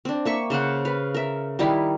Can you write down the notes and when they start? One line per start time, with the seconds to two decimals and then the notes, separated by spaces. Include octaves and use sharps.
0.05 C4 D4
0.25 A#3 E5 C#6
0.50 C#3 C5 F5 F#5
0.85 B4 F5
1.14 A#4 E5
1.59 D#3 G3 D#4 E4